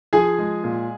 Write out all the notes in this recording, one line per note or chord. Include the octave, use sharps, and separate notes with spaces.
F3 G#4 G#5
G#3
A#2